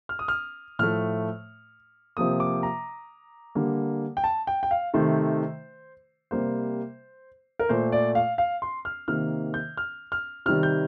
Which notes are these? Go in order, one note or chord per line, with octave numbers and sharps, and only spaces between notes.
F6
D#6
F6
A2 F3 A3 F6
C3 F3 A#3 D#6
D6
A#5
D3 G3 A#3
G5
A5
G5
G5
F5
C3 D#3 A3 C5
C3 G3 A#3 C5
A#4
A#2 A3 C5
D5
F5
F5
C6
F6
C3 D#3 A#3 F6
G6
F6
F6
C3 D#3 G3 F6
G6